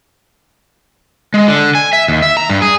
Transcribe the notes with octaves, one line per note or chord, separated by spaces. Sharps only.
G#3
D3
G#5
E5
D#2
E5
A#5
G2
G#4